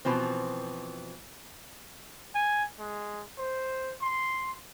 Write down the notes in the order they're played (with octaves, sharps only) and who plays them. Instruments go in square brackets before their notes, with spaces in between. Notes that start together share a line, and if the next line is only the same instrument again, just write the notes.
[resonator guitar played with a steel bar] B2 E3 F3 C4
[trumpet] G#5
G#3
C5
C6